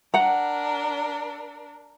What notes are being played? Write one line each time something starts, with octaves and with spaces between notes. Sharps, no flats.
D4 A#4 F#5 A#5